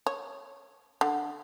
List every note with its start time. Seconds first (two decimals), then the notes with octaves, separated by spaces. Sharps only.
0.07 C#5
1.01 D3